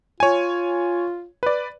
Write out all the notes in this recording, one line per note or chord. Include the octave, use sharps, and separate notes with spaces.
F4 C#5 G#5
B4 D5